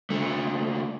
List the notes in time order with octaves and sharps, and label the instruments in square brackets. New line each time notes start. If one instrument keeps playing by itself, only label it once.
[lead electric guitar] C#2 A3